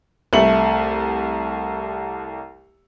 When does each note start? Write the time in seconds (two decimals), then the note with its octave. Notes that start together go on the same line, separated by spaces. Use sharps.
0.33 C2 A3 E5 C#7 F#7